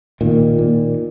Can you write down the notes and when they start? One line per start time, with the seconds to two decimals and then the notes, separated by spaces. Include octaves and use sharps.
0.21 A#2 D#3
0.58 A#2